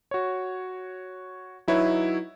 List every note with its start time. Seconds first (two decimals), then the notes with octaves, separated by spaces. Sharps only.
0.11 F#4 C#5
1.68 F#3 D#4 E4 B4 C#5 E5